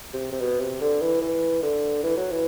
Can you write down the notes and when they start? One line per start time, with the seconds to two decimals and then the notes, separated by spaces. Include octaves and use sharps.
0.13 C3
0.32 C3
0.41 B2
0.60 C3
0.81 D3
1.01 E3
1.21 E3
1.62 D3
2.03 E3
2.17 F#3
2.31 E3